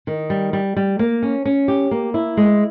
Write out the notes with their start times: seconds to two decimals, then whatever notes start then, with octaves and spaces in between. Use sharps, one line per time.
0.07 D#3
0.30 G3
0.53 G3
0.76 G3
0.99 A#3
1.23 C#4
1.45 C#4
1.68 G4
1.91 A#3
2.14 E4
2.37 G#3